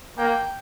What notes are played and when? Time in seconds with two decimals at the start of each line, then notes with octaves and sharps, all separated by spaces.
0.18 A#3 G5